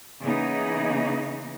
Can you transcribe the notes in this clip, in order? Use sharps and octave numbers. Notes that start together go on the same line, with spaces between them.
C#3 E3 A#3 B3 D#4